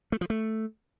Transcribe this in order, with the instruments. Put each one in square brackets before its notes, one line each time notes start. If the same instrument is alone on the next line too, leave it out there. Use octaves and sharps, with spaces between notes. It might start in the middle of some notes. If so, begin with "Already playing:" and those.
[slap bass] A3
F3
A3